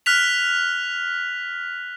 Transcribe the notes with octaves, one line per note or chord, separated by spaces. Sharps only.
F6 F#6 B6 F7